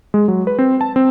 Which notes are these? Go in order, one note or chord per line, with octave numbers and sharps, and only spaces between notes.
G#3
F#3
B4
C4
A5
C4